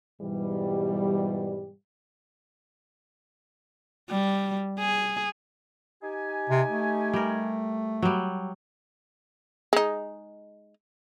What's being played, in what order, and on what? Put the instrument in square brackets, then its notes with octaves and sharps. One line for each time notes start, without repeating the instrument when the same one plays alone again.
[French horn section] G#2 B2 E3 G3
[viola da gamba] G3
G#4
[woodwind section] D#4 G4 G#5
[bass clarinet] C3
A3
[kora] G3 A#4
F#3 G3
[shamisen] G#3 D#4